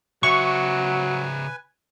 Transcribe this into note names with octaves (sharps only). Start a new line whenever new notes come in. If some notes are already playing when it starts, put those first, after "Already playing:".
C#3 F#3 B4 E5 G#5 C#6